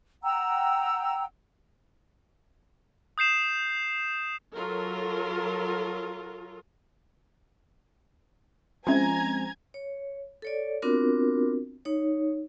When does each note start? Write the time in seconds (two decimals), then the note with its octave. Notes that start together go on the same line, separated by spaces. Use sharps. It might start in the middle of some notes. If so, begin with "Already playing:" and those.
0.23 F#5 G5 A#5 E6
3.18 D#6 G6 C7 E7
4.55 F#3 F4 A4 A#4
8.87 F3 G#3 C4 C#4 E5 G#5 A#5 G#6
9.74 C#5
10.42 A4 C#5 D5
10.82 B3 C4 D4 F4 F#4 A#4
11.85 D#4 C#5